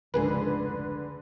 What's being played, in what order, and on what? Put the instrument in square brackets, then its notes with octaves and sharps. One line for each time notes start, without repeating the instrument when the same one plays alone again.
[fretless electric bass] F1 C#2 G#2 [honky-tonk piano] D3 G#4 B4